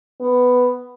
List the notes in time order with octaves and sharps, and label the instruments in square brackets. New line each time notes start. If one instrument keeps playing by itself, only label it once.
[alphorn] B3